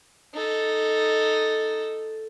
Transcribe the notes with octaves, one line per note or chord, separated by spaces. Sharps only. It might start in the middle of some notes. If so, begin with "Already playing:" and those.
D#4 A4